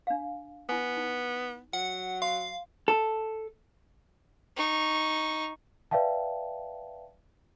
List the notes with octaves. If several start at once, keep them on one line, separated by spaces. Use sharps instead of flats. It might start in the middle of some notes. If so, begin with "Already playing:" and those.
D4 F5
B3 E4 G#5
D#4
F#3 F#5
F5 C6
A4
D#4 C#6
B4 D5 E5 F5 G5 A5